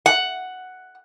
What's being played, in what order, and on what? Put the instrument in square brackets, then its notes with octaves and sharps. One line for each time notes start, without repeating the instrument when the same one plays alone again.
[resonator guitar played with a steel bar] F#5